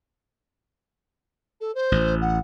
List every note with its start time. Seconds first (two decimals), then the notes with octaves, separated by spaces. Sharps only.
1.61 A4
1.75 C5
1.92 A1
2.21 F#5